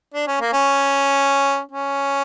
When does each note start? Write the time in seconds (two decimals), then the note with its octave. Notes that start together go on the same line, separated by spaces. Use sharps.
0.14 D4
0.27 C#4
0.41 A#3
0.53 C#4
1.72 C#4